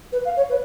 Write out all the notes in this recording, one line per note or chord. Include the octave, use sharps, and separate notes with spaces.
B4
F5
C#5
B4